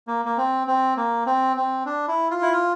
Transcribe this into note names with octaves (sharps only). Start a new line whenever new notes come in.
A#3
A#3
C4
C4
A#3
C4
C4
D4
E4
F4
E4
F4